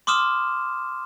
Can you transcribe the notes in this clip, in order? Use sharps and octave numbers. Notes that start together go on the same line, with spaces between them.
C6 D6 D#6 F6 E7